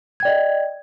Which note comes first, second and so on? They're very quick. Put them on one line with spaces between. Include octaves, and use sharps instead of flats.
G#6 G5 D5 D#5